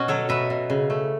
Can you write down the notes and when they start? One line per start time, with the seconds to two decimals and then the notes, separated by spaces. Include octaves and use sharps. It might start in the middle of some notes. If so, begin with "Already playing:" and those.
Already playing: B2 C#4 F#4
0.08 F#3 A4 C#5
0.29 B2 B4 E5
0.50 B2
0.70 C#3
0.90 A3